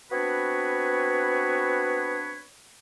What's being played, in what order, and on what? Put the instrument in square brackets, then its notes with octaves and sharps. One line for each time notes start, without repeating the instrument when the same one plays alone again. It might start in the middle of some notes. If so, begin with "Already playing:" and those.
[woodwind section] B3 C4 D4 F#4 B4 C#5